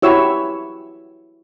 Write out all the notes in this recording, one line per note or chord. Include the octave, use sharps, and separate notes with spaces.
E4 F#4 G4 C#5 E6